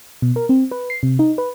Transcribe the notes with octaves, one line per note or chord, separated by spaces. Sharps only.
B2
A#4
C4
B4
C7
C3
D#4
B4